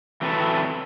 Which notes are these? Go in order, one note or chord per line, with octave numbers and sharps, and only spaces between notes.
E3 F#3 C4 A4 B4